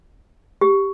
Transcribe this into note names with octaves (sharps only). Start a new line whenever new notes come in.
G4